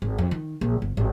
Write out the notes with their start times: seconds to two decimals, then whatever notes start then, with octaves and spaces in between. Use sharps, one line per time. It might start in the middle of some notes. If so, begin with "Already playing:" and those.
0.02 G#1
0.18 F2
0.31 D#3
0.61 A#1
0.82 G1
0.97 G#1